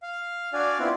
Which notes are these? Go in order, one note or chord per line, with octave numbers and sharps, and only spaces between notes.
F5
D4 F#4 D5 F5 G#5
B3 C4 E4 F4 D5